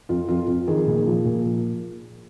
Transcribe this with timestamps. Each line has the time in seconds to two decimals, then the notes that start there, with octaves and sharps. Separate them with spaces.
0.09 F2 F4
0.28 F2 F4
0.47 F2
0.67 D#3 G#4
0.87 A#2
1.06 F3
1.25 A#2